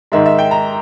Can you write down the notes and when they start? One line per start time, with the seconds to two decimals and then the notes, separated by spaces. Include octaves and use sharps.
0.12 G#2 D#3 G#3 E5
0.26 E5
0.39 G5
0.51 A#5